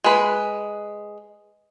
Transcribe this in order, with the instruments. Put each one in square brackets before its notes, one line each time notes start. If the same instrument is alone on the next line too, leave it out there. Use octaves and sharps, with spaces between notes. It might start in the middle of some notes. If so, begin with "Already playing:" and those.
[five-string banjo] G#3 B4